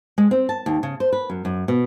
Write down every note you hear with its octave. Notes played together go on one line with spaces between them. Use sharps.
G#3
C4
A5
D#2
C#3
C5
B4
F#2
F#2
B2